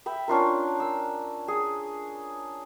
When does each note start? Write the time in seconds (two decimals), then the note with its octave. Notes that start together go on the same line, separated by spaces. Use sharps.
0.06 E5 G5 B5
0.28 C#4 D4 F4 A#4
0.80 E6
1.48 G#4